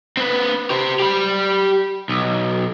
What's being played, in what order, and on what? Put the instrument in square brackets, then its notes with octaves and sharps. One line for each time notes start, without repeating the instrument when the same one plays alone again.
[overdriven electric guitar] C4 B4
G4 C5
G4 B5
B1